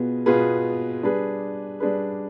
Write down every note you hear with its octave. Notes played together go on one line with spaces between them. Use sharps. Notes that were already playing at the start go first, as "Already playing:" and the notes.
Already playing: B2 B3 F4 G#4
B2 B3 F4 G#4 B4
G3 D4 G#4 B4
G3 D4 G#4 B4